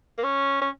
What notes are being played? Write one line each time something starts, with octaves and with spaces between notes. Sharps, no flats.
A#3
C#4
C#4